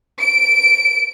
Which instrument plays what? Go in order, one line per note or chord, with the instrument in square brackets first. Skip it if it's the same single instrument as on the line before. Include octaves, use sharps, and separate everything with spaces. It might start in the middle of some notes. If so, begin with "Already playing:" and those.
[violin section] D7